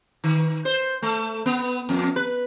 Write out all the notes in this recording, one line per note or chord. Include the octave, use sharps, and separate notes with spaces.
D#3
C5
A3
B3
F2
B4